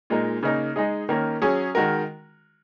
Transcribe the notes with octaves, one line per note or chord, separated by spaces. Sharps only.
A#2 G#3 D#4 A#4
C#3 A#3 D#4 A#4
G#3 D#4 G#4
D#3 A#3 C#4 A#4
F#3 C#4 G#4
D#3 G#3 F#4 A#4